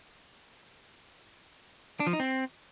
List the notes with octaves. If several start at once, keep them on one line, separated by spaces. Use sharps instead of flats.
D4
F3
D#4
C4